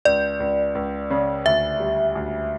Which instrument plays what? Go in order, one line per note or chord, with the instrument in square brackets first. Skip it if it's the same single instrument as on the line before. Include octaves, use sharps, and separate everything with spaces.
[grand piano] C#2 [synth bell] D5
[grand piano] C#2
C#2
C#3
[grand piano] D2 [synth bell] E5
[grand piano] G3
D2